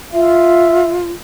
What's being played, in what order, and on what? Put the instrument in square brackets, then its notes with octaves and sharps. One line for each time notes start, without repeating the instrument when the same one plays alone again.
[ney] F4 [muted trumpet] E5